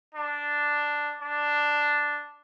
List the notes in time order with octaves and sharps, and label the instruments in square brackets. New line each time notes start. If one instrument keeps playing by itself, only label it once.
[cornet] D4
D4